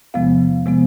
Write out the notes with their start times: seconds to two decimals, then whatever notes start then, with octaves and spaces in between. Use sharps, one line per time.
0.14 E2 C3 F3 G#3 B3 F5
0.66 C3 F3 G#3 B3